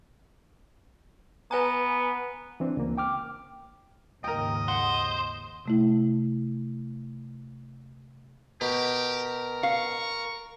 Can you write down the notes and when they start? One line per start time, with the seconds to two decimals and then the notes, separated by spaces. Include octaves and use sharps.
1.51 B3 B4 G#5 A#5
2.60 E3 C4 D4
2.77 C#2 A#3
2.97 G5 D6 F6
4.24 D#2 G#2 C#3 A#4 D#5 G5
4.68 C5 F#5
5.66 C3 A3 E4
8.61 B2 G4 A#4
9.63 F5 C#6